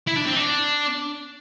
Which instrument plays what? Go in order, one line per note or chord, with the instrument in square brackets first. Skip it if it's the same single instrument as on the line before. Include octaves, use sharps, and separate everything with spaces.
[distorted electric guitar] E4
D4
C4
D4